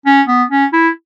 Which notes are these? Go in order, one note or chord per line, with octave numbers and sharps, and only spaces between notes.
C#4
B3
C#4
E4